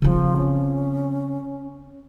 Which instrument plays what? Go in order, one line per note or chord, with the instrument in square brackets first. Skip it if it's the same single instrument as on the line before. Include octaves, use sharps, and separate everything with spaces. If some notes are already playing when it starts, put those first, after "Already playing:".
[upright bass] C#3 C4 [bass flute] F3
[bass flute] C#4